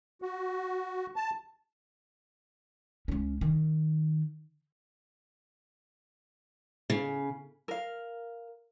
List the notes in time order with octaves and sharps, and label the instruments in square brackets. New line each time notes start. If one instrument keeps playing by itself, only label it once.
[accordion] F#4
A5
[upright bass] C#2 C#4
D#3
[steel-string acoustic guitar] C#3
[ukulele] A#4 F5